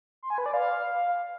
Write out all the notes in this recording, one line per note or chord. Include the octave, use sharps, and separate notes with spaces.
C6
G#5
B4
D5
F5